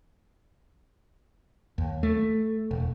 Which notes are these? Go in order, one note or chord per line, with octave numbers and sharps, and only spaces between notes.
D#2
A3
E1